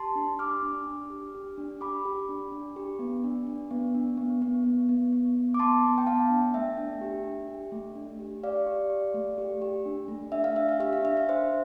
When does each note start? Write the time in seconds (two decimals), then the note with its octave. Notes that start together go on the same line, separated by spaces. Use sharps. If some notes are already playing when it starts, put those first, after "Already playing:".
Already playing: G4 A5 C6
0.16 D4
0.39 G4 D6 F6
0.63 D4
0.87 D4
1.10 G4
1.35 G4
1.58 D4
1.81 G4 B5 D6
2.05 G4
2.29 D4
2.52 D4
2.76 G4
2.99 B3
3.24 D4
3.47 D4
3.71 B3
3.95 D4
4.17 B3
4.42 B3
4.64 B3
4.89 B3
5.12 B3
5.35 B3
5.54 D6
5.59 B3 A5 C6
5.84 B3
5.98 G5
6.06 B3 F5 A5
6.30 D4
6.54 A3 E5 G5
6.77 D4
7.01 G4
7.24 D4
7.48 G4
7.72 A3
7.96 D4
8.19 G4
8.43 G4 D5 F5
8.66 G4
8.90 G4
9.14 A3
9.38 G4
9.62 G4
9.86 D4
10.08 A3
10.32 D4 E5
10.44 F5
10.56 D4 E5
10.69 F5
10.80 G4 E5
10.93 F5
11.03 D4 E5
11.17 F5
11.27 D4 C5 E5